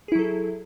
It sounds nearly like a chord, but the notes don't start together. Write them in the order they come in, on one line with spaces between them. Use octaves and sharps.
G#4 E4 F#3 A4